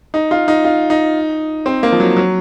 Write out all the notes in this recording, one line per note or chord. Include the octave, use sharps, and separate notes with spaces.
D#4
F4
D#4
F4
D#4
C4
A#3
F3
F#3
F#3